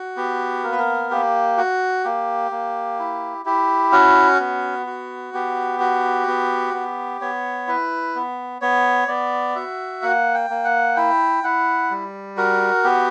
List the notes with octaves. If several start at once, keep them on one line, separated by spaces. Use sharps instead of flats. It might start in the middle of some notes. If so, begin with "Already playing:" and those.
Already playing: F#4
B3 G4
A#3 A#4
B4
A#4
A#3 G4
F#4
A#3 G4
A#3
E4
E4 G4
C#4 F#4
B3
F#4
B3 G4
F#4
B3
B3
B3 C#5
E4 B4
B3
B3 C#5
B3 D5
F#4 E5
A#3 F#5
G5
A#3
F#5
E4 G5
E4 F#5
G3
F#4 A#4
B3 G4